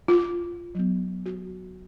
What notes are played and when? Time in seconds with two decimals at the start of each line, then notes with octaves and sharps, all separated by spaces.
0.08 F4
0.75 F#3 B3
1.26 F#4